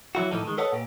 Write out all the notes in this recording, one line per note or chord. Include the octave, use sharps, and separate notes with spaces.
E3 F#3 E4 F#4
A2 E3 F3 D#4 A4
D#3 G#3
A4 B4 C#5 D#5 F#5 A5
A#2 G4